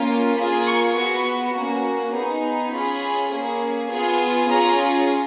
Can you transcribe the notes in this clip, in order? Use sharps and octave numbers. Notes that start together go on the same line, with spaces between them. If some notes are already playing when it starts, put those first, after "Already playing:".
Already playing: A#3 C#4 F4
A#3 F4 G#4 B5
C#6
B3 F#4 C#6
A#3 C#4 F#4
B3 D#4 G#4
C#4 F4 G#4 B5
A#3 C#4 G#4
B3 F4 G#4
C#4 F4 G#4 A#5